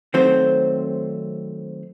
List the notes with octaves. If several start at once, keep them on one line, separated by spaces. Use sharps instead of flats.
D#3 F#3 A3 C4 C5